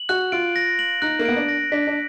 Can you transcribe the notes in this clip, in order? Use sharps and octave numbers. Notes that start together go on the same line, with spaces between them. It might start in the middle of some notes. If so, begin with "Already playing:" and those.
Already playing: F#7
F#4 F#6
F4 D7
A#6
F#7
D#4 F#6
A#3
B3 D7
D4
A#6
D4 B6
D4